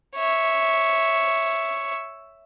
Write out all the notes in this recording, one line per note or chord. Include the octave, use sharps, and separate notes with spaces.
C#5 E5